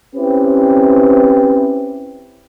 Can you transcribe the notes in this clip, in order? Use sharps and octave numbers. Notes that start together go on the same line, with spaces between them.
C4 C#4 E4 G4 B4